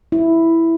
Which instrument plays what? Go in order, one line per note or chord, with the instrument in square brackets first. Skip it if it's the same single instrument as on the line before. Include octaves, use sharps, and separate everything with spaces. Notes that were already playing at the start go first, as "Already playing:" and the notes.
[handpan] E4